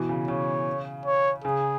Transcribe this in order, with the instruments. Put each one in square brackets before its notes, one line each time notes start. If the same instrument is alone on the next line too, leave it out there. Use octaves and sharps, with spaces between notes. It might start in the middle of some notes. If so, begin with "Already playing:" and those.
Already playing: [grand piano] B2 E3
C#3
[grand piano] C#3 [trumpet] C#5
[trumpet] C#5
[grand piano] C#3 [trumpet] G#4